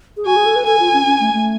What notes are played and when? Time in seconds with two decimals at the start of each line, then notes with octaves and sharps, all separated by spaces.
0.17 G#4
0.26 F#4 G#5
0.36 G#4
0.46 A4
0.56 B4
0.66 A4 G#5
0.80 F4
0.93 C#4
1.06 C#4
1.20 A3
1.34 A3